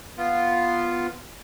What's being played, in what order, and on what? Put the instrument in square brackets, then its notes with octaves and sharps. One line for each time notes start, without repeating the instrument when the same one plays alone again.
[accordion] B3 F4